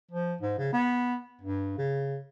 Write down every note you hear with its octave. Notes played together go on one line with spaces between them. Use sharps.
F3
G#2
C#3
B3
G2
C#3